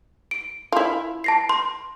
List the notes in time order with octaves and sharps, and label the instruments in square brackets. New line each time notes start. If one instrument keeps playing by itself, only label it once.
[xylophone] D7
[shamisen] E4 F4
[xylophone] A5 A#6 C7
C6